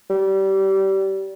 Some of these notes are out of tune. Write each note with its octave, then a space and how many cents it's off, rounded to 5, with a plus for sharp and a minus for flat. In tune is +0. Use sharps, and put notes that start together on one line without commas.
G3 -25